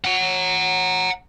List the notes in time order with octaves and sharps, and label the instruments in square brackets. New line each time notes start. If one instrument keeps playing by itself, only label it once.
[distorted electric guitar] F#5 A#5